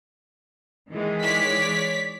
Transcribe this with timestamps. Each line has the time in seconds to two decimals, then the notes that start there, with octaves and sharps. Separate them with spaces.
0.90 D#3 E3 G#3
1.22 C#5 D5 B6